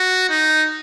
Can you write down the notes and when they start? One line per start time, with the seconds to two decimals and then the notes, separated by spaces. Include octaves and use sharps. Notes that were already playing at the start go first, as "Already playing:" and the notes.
Already playing: F#4
0.30 D#4